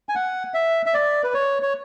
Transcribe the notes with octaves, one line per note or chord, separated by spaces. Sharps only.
G#5
F#5
E5
E5
D5
B4
C#5
C#5